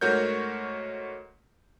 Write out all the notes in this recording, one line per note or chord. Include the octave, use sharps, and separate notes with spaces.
G#2 A3 F#4 A#4 C#5 G6